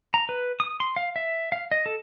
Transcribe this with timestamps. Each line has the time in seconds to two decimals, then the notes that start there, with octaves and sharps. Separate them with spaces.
0.14 A#5
0.29 B4
0.60 D#6
0.80 C6
0.96 F5
1.16 E5
1.52 F5
1.71 D#5
1.86 A4